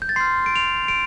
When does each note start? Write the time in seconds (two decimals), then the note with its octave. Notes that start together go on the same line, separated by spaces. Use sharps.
0.02 G6
0.09 A6
0.16 C6 F6 C7
0.46 D7
0.56 F7
0.88 D7